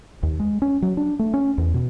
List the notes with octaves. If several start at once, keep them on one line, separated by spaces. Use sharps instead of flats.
D#2
G#3
C#4
F#3
D4
A3
C#4
E2
B2